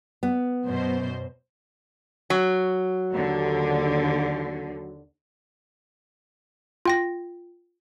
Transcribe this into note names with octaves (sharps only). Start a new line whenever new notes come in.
B3
F#2 B2 C5
F#3
D#2 D3
F4 G5 A#6